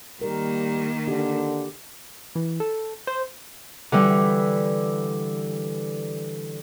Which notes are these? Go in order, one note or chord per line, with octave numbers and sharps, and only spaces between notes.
D#3 G3 A#3 A#4
D3 G4
E3
A4
C5
D3 E3 G3